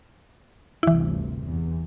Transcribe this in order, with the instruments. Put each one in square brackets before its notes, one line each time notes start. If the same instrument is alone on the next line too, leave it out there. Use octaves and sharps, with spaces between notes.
[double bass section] G1 D2 C3 [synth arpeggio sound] E3 E4
[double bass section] E2